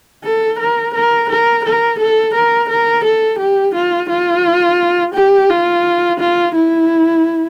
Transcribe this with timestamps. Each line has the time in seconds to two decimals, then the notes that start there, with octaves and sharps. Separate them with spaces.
0.24 A4
0.59 A#4
0.94 A#4
1.29 A#4
1.64 A#4
1.99 A4
2.34 A#4
2.69 A#4
3.05 A4
3.39 G4
3.74 F4
4.09 F4
5.14 G4
5.49 F4
6.20 F4
6.55 E4